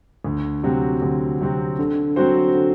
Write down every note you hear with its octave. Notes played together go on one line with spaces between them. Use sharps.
D2
C3 F#3 C4 F#4
D2
C3 F#3 C4 F#4
D3
F#3 C4 F#4 C5
D3